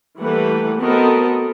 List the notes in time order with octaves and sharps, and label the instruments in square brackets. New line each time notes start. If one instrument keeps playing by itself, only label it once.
[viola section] E3 G3 A3 A#3 B4 F#5
B3 C4 F#4 A4 A#4 D#5